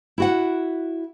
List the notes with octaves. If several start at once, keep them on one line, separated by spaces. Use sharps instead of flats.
E4 F#4 F#5